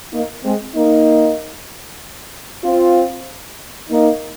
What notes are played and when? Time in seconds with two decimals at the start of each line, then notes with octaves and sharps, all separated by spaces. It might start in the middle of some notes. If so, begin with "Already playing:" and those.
0.12 A#3 D#4
0.43 G#3 C4
0.75 A#3 D#4
2.64 C4 F4
3.89 A#3 D#4